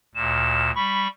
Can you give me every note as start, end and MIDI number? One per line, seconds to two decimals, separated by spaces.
0.15 0.71 38
0.15 0.71 46
0.15 0.72 100
0.75 1.08 55
0.75 1.08 83
0.75 1.08 85